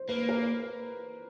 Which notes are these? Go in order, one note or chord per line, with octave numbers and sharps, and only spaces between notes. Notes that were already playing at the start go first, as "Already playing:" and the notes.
Already playing: C5
A#3 B4
A#4